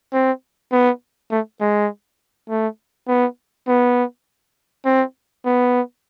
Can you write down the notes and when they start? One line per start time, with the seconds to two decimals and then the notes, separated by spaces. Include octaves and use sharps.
0.13 C4
0.72 B3
1.31 A3
1.61 G#3
2.50 A3
3.08 B3
3.68 B3
4.85 C4
5.45 B3